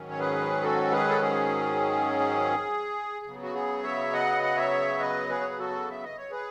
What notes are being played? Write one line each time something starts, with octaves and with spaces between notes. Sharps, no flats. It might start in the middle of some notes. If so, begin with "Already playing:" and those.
Already playing: G#2 D#3 F#3 C#4
C#5
G#4 B4
F#4 A4
G#4 B4
A4
G#4
C#3 F#3 B3
F#4
G#4
C#5 E5
D#5 F#5
F#5
C#5 E5
B4 D#5
G#4 B4
C#5
B4
F#4 A4
E5
D#5
C#5
G#4 B4